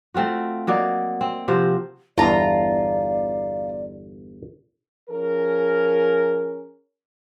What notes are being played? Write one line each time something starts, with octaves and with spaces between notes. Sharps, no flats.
A3 C4 F4 F#4
F#3 A#3 D5 D#5
C4
C3 F3 F#4 C5
G1 E2 E4 F4 D5 A5 A#5
F3 C#4 G#4 A#4